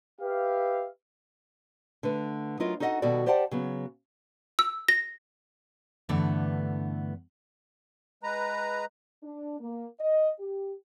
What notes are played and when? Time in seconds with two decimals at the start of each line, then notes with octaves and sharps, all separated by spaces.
0.21 G4 B4 E5 F5
2.03 D3 A3 B4
2.60 F#3 E4 F4 A#4 D#5
2.80 D#4 F#4 A4 D#5 E5 F#5
3.02 B2 D#3 G3 F#4 A4 D5
3.26 G4 C5 D5 F#5 G5 A5
3.51 C#3 F#3 B3
4.59 E6
4.88 A#6
6.09 G2 D3 E3 A3 B3
8.23 G#3 B4 A#5
9.23 D4
9.60 A#3
10.00 D#5
10.40 G4